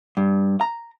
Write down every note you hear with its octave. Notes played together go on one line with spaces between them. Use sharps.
G2
A#5